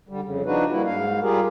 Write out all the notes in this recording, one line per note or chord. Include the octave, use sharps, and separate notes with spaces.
D3 G3
F2 C#3
F3 D4 D#4 F#4 B4
G3 A#3 E4 F#4
G#2 F5
G3 F4 G4 G#4 A#4